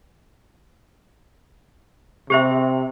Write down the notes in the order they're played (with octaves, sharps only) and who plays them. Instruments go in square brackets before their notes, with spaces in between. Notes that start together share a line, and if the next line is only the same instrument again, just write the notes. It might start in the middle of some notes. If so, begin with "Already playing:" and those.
[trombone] C3 [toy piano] G4 C5 E5